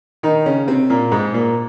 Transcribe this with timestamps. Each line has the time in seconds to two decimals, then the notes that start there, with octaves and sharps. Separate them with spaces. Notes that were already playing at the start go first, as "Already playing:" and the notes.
0.23 D#3 D#4
0.46 C#3 C#4
0.68 C3 C4
0.90 A#2 A#3
1.11 G#2 G#3
1.34 A#2 A#3